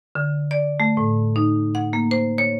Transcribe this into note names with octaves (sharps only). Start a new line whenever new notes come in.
D3
D5
A3
A2
D#4
F#5
A#3
C5
C#5